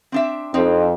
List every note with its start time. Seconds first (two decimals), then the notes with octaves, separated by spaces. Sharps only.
0.12 C4 D4 E5
0.54 F2 C4 D#4